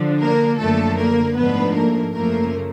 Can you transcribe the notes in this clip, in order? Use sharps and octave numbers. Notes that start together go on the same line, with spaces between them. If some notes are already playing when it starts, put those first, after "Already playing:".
Already playing: D3 F3 D4
A#3 A#4
F#2 D3 F3 A3 A#3 A4
A#3 A#4
G#2 F3 A3 B3 D4 B4
A#3 A#4
F#2 C#3 F3 A3 A#3 A#4